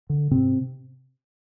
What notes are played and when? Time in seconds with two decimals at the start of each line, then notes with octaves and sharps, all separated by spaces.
0.10 D3
0.31 G#2 C3 C4